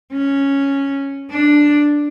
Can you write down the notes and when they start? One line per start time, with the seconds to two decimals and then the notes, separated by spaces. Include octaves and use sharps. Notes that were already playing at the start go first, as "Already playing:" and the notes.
0.13 C#4
1.30 D4